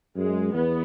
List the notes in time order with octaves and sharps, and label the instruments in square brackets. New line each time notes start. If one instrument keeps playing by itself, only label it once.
[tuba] F#2 [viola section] G#3
[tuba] E2 [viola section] B3